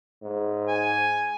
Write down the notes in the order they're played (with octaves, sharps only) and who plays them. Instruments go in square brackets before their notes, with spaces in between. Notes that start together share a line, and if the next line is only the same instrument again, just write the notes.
[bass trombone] G#2
[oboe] G#5